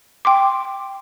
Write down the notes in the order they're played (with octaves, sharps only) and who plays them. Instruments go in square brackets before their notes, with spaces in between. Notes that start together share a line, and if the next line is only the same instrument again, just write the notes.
[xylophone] G5 C6 D6